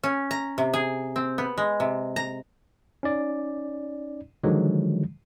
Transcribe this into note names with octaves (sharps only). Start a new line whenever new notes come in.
C#4
A#5
C3
G#4
C4
B3
G#3
C3
A#5
C#4 D#4 D5
D3 D#3 F3 F#3 G#3